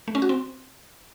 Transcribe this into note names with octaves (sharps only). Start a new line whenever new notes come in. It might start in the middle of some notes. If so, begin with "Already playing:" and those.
A3
C#4
F#4
C4